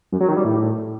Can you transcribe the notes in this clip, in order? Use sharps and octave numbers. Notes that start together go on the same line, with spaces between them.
F#2
F#3
D#3
G3
A2